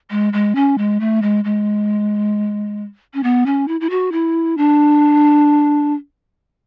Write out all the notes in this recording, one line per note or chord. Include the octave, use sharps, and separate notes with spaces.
G#3
G#3
C#4
G#3
A3
G#3
G#3
C#4
B3
C#4
E4
E4
F#4
E4
D4